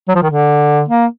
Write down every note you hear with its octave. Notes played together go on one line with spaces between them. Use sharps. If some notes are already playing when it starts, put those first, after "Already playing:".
F#3
F3
D#3
D3
A#3